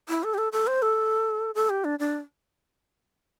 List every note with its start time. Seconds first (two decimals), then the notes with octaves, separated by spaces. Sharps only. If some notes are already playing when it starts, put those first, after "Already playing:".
0.09 E4
0.24 A4
0.34 G4
0.38 A4
0.52 A4
0.67 C5
0.82 A4
1.55 A4
1.70 G4
1.85 D4
1.99 D4